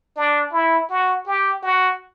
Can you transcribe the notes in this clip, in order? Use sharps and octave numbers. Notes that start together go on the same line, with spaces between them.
D4
E4
F#4
G4
F#4